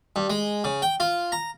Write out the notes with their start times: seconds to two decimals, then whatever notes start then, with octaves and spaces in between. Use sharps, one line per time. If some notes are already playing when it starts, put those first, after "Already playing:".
0.16 G2
0.30 G#3
0.64 C#3
0.82 G5
1.00 F4
1.32 A#5